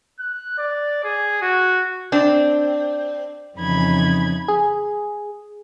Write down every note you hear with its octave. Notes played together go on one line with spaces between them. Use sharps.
F#6
D5
G#4
F#4
C4 D4
F2 C#3 E3 D#4 B5 G#6
G#4